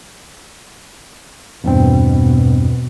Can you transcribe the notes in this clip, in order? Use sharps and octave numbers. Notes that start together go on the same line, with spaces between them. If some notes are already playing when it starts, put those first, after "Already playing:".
E2 G2 B2 C4